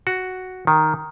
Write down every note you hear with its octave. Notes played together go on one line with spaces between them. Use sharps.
F#4
D#3